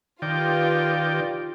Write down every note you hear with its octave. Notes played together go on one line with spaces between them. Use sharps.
D#3 F4 G4 B4 D5 G5